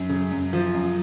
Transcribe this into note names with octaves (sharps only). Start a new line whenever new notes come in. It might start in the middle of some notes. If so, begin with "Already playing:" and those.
Already playing: F#2
C#3
F#2
F3
F#2